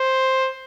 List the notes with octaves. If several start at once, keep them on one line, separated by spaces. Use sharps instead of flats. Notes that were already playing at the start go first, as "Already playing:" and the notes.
Already playing: C5